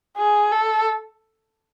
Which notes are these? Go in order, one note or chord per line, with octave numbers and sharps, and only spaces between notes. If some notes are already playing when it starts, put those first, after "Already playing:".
G#4
A4